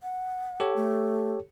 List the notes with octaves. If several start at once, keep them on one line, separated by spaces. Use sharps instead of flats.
F#5
G4 A4 C#5
A3